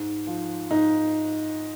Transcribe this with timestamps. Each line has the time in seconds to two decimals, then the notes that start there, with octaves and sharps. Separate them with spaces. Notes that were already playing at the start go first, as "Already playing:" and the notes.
Already playing: G#2
0.27 F3
0.71 G#2 D#4